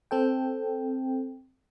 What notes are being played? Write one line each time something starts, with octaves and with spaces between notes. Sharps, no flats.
C4 A4 G5